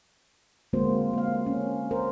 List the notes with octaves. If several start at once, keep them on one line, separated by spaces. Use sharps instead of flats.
D3 G#3 A#3 C4 F#4 C5
A#3 F5
C#4
A#4 C5